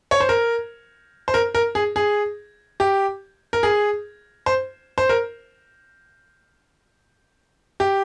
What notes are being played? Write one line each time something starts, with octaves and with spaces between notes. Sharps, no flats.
C#5
C5
A#4
C5
A#4
A#4
G#4
G#4
G4
A#4
G#4
C5
C5
A#4
G4